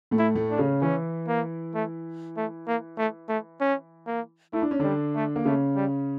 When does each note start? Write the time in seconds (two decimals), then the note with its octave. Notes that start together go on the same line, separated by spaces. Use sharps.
0.11 A2 A3
0.19 E4
0.35 A2 A3
0.51 D4
0.58 C#3 C#4
0.82 E3 C#4 E4
1.27 A#3
1.74 A3
2.37 A3
2.68 A#3
2.98 A3
3.29 A3
3.61 C#4
4.07 A#3
4.53 A3 E4
4.62 D4
4.71 C#4
4.79 D3 G3 D4
5.15 A3
5.36 A#3
5.45 C#3 A3 C#4
5.76 G3